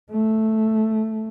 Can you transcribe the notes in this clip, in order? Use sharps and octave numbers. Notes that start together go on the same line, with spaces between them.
A3